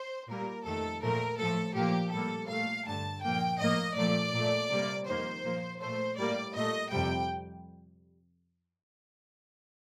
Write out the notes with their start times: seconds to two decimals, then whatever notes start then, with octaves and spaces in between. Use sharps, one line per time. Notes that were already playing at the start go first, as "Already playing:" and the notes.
Already playing: C5
0.29 A#2 G3 A#3 A#4
0.66 F2 D#3 A3 A4
1.03 A#2 F3 A3 A#4
1.39 A2 F3 A3 A4
1.76 A#2 F3 A#3 G4
2.13 A2 G3 A#3 A4
2.50 A#2 A3 F5
2.87 G2 D3 A3 A5
3.23 A#2 F3 A#3 G5
3.60 A2 F3 A#3 D#5
3.97 A#2 F3 A3 D5
4.34 A#2 A3
4.70 C3 G3 A#3
5.08 F2 D#3 A#3 C5
5.44 A#2 F3 A#3
5.81 A#2 A3 C5
6.17 A2 G3 A#3 D5
6.54 A#2 A3 D#5
6.91 F2 C3 G3 G5